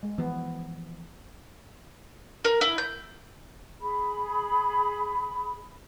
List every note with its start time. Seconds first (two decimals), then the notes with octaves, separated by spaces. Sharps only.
0.03 G#3
0.18 E3 F3 B3
2.45 A#4
2.61 E4
2.78 G6
3.80 G#4 B5